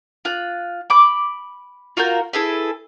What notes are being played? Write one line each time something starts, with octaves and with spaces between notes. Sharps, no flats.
F4 F#6
B5 D6
F4 F#4 A#4 G6
E4 G#4 A4 B4